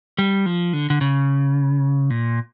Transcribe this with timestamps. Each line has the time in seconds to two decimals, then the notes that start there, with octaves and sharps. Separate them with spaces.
0.18 G3
0.46 F3
0.73 D3
0.90 D3
1.01 C#3
2.10 A#2